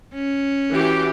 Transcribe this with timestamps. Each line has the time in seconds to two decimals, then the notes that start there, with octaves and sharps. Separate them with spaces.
0.14 C#4
0.72 E3 F#4 G4